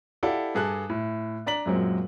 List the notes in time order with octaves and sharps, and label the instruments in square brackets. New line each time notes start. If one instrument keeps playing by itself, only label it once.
[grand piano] E4 G4 A4 D5 F5 F#5
G2 G#4 A4 F#6
A2
D4 D5 A#5 B6 F#7
F#2 A#2 F#3 G#3 C4